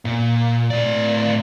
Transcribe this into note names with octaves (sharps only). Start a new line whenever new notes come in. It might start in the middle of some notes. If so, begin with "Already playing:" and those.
A#2
A2 D5